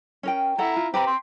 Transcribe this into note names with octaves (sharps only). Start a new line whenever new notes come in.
C#4 A#4 G5
E4 A4 F#5 A#5
F4
C4 G4 B4 A#5 B5
G5 C6